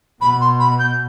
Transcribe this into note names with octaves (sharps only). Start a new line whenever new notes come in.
B2 B5
C6
B5
G6